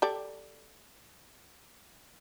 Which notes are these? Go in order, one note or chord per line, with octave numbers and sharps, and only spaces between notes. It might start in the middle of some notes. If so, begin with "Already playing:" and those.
G4 A4 D5